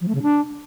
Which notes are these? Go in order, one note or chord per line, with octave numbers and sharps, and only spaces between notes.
F3
A3
C#3
D4